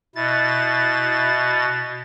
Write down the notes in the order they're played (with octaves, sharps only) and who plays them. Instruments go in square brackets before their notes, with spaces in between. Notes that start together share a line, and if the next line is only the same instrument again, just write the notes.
[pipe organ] B2 A6 [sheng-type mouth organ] E4